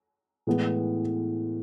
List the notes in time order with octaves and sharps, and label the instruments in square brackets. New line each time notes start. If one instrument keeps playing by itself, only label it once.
[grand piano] A2 E3 G#3 B3